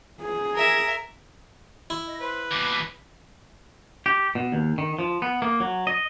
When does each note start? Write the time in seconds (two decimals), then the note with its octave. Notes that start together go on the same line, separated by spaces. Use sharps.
0.21 G#4
0.55 A#4 E5
1.90 E4
2.07 D#5
2.20 B4 C5
2.51 D#2 B2 D6
4.06 G4
4.35 B2
4.52 D#2
4.78 D#3
4.99 F3
5.22 B3
5.42 A#3
5.60 F#3
5.87 D#5